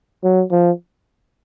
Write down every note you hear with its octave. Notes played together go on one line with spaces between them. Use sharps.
F#3
F3